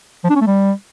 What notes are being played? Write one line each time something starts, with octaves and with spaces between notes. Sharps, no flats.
F3
D4
C#4
A3
G3